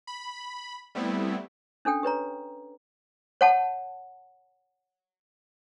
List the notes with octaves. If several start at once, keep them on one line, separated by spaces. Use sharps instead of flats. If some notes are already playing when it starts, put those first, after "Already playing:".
B5
G3 A3 B3 C4 E4
C#4 D4 A4 G5
G4 B4 C#5 A#5
C#5 F#5 A5